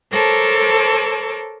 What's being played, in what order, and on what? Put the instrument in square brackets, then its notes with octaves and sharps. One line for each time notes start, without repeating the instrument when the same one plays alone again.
[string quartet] A4 A#4 C5 C#5 A5 D6